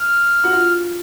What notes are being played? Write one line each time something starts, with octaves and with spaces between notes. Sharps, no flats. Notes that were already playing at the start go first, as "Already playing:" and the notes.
Already playing: F6
F#4
F4